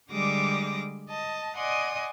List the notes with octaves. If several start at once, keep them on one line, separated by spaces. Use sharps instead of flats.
D3 G3 G#3 D6 D#6 A#6
D#5 A5
D5 D#5 F#5 G#5 C6 D#6